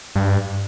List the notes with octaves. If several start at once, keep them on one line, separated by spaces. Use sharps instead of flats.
G2